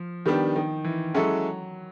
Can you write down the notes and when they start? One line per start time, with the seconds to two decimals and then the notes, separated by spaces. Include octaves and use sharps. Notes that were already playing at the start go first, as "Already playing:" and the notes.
Already playing: F3
0.26 D#3 G3 B3 D4 G4
0.56 D#3
0.84 E3
1.14 F#3 G#3 C#4 E4 A4